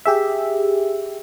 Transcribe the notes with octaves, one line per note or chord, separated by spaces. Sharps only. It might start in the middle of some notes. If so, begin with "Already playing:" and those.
G4 G#4 E5